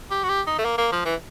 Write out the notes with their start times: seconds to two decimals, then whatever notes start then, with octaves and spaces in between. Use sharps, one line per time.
0.11 G4
0.24 F#4
0.29 G4
0.47 D#4
0.59 A3
0.65 A#3
0.78 A#3
0.92 F3
1.05 E3